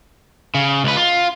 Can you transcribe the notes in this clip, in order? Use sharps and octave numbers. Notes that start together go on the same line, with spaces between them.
C#3
C#2 B4
F4